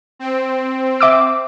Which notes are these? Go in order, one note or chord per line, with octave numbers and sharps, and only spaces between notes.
C4
E5 D6 E6